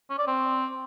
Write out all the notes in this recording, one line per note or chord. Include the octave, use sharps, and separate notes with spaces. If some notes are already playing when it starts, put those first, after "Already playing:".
C#4
D5
C4